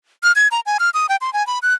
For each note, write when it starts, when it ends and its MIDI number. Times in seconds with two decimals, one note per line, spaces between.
0.23 0.32 89
0.36 0.48 92
0.51 0.60 82
0.66 0.77 80
0.80 0.90 89
0.94 1.07 87
1.09 1.16 79
1.21 1.33 84
1.33 1.45 80
1.47 1.59 83
1.62 1.74 90